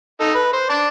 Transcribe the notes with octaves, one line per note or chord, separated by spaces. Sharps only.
D#4 A4
B4
C5
D5 A5